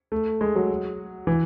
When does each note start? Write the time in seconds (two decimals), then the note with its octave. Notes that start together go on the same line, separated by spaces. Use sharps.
0.12 A3
0.41 G#3
0.55 F#3
1.27 E3